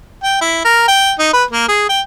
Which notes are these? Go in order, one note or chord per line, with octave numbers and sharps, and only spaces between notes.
G5
E4
A#4
G5
D#4
B4
A#3
G#4
G5